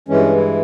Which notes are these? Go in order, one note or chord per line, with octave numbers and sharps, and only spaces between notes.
G2 E3 G#3 C#4
E4